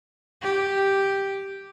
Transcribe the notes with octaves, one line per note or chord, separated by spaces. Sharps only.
G4